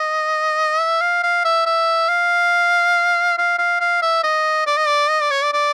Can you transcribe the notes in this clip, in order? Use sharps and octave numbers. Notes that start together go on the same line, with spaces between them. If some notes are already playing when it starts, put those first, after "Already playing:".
Already playing: D#5
E5
F5
F5
E5
E5
F5
F5
F5
F5
E5
D#5
D5
D#5
D5
D#5
D5
C#5
D5
D5